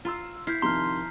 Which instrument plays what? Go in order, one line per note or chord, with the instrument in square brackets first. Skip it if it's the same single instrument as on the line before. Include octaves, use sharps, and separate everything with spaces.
[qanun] F4 [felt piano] A#5 C6 E6
[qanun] E4 [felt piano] F6 [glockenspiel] G6 B6 C7
[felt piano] C3 D#3 F3 [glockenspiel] A#5 F6 [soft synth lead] C6